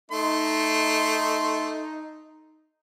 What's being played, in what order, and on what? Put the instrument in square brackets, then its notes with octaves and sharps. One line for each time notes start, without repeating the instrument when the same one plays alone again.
[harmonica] A3 C6 [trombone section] D#4